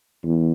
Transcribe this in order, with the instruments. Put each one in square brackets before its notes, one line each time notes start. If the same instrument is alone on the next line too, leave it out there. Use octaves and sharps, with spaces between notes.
[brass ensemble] E2